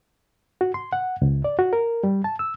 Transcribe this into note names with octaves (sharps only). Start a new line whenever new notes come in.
F#4
C6
F#5
C#2
D5
F#4
A#4
G3
A5
E6